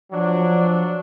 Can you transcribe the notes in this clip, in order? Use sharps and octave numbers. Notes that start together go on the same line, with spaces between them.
F3 F#3 D4